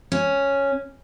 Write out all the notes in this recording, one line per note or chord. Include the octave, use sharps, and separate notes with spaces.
C#4